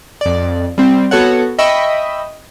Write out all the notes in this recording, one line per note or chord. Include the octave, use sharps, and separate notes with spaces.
F2 D5
G3 C4
B3 F#4 A4 C#5 F#5
D#5 E5 G5 B5 C#6 E6